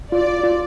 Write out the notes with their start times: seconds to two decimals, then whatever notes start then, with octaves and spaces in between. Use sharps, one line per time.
0.12 F4 D5
0.44 F4